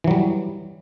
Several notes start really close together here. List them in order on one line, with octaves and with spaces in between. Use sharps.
E3 F#3 G3